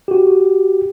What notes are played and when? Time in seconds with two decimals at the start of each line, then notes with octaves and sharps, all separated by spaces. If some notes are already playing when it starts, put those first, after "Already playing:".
0.08 F#4 G4